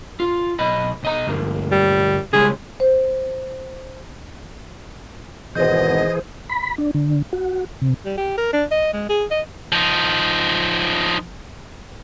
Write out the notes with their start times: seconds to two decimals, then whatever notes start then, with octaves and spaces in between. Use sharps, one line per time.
0.20 F4
0.59 B1 D#5 B5
1.03 B1 D#5 A#5
1.27 D2 G2 A#3
1.72 G3
2.33 C#3 G3 G#3 G#4
2.80 C5
5.55 G#1 B2 E3 G#4 C5 D#5 G6
6.50 B5
6.78 D4
6.94 D3
7.33 F#4
7.82 C3
8.05 G3
8.18 G4
8.38 A#4
8.53 D4
8.71 D#5
8.93 G#3
9.09 G#4
9.31 D#5
9.72 F3 D#4